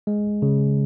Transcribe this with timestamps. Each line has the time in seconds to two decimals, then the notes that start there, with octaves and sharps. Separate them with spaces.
0.07 G#3
0.42 C#3